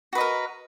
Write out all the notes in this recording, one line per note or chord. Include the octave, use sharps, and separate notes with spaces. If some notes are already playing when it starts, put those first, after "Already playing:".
F#4 A#4 B4 D#5